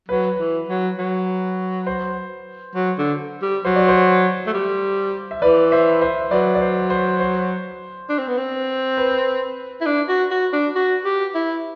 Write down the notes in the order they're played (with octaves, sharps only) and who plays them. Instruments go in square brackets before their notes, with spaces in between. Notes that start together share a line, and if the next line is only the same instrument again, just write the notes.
[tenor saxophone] F#3 [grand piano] B4
[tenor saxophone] E3
F#3
F#3
[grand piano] C5
[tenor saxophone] F#3
D3
G3
[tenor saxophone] F#3 [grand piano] C5
[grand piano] D5
C5
[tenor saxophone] A3
G3
[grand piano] E5
[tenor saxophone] E3 [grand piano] B4 D5
[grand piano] C5 E5
C5 E5
[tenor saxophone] F#3 [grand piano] B4 D5
[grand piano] D5
C5
C5
C5
[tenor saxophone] D4
C4
B3
C4
[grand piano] B4
[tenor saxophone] E4
D4
F#4
F#4
D4
F#4
G4
E4